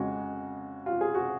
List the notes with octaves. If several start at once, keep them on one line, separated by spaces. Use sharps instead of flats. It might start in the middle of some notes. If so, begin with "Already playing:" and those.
Already playing: F2 C#3 G#3 F#4
F4
G#4
F#4